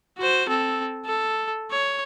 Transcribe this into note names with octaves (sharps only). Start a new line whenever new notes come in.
F#4 C5
C4 A4
A4
C#5